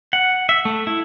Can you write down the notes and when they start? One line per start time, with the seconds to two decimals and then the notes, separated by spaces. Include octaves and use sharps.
0.13 F#5
0.49 E5
0.65 A3
0.87 E4